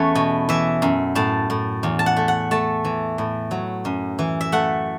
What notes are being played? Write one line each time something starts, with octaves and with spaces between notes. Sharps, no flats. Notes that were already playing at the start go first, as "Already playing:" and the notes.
Already playing: E2 E3 A3 C#4 E4 B4 C#5
B2
E3 E5
F#2
A2 A5
A2
E2
A5
F#5
A3
F#5
A3 A5
E3
A2
F#3
F#2
E3
E5
A3 F#5